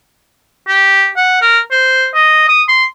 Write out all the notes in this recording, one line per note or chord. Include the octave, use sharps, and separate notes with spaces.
G4
F#5
A#4
C5
D#5
D#6
C6